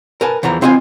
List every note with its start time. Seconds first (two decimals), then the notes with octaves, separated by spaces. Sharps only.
0.21 A#4 B4 G#5 A5
0.43 E2 E3 F3 A#5
0.61 E3 C4 F4 D#5 F#5 G#5